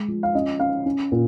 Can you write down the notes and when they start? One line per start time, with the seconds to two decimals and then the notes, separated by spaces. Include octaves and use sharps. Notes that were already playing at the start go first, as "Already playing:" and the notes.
Already playing: G#3
0.08 F3
0.23 F5
0.35 C#4 D#5
0.59 C#4 F5
0.86 C#4
1.12 A#2